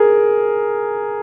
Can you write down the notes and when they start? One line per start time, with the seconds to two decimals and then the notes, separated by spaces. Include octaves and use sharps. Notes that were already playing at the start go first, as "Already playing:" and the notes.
Already playing: G#4 A#4